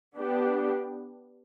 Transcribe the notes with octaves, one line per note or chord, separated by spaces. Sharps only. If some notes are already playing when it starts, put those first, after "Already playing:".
B3 D4 G4